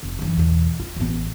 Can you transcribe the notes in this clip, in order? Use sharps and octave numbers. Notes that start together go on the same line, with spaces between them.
F1
F#2 E3
B1 E2
F4
A1 B3